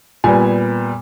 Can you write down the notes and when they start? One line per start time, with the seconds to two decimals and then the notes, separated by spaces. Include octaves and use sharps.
0.24 A#2 G3 B3 G#5